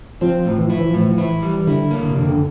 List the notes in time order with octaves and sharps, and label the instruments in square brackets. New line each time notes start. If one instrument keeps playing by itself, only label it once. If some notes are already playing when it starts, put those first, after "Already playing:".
[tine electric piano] F3 [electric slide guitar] C4
[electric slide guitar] A2
[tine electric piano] E3
[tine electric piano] F3 [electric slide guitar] E4
[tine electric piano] E3
F3
[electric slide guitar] A2
[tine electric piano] E3
F3
[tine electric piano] E3 [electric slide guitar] E4
[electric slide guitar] G3
[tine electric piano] E3
[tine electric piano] D3 [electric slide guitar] E4
[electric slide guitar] A#3
[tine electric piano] D3
C3
[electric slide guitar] F2 [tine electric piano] D3
[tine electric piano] D3